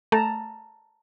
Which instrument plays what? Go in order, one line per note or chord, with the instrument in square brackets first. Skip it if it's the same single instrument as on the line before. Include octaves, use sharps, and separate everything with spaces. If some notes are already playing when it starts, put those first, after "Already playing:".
[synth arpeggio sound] A3 [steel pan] A5 A#5